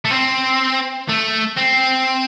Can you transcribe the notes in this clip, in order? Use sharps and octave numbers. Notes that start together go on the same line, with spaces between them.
A3
C4
A3
C4